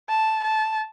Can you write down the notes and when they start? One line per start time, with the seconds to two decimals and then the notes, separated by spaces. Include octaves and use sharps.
0.09 A5
0.44 A5